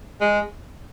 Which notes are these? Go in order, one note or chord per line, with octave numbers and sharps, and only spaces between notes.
G#3